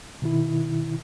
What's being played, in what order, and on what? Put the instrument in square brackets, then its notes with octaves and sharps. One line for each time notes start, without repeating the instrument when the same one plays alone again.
[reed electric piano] B2 D#3 E4